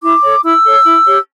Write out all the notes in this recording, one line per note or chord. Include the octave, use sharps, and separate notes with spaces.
E4 D6
A4 C#5
E4 E6
A4 C#5
E4
G4 C#5